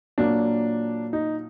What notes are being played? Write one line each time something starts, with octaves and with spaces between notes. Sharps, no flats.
A#2 F#3 A#3 D4
D#4